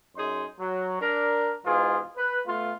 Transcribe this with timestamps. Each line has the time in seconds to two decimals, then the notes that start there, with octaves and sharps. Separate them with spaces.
0.17 F#2 D#4 G#4 C6
0.59 F#3
1.01 D4 A#4
1.65 G#2 B2 E3 F4 G#4
2.17 B4
2.47 A3 B3 F4